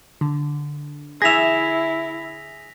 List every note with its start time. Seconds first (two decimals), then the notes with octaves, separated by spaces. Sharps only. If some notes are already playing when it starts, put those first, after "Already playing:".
0.21 D3
1.22 E4 G#4 E5 A#6 B6 F7